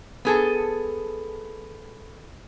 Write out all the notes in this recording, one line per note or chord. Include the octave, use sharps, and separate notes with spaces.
B3 G#4 A4